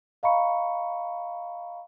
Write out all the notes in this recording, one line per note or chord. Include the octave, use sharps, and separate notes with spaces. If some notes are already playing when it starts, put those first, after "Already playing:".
D#5 F5 A#5 B5 C#6 C#7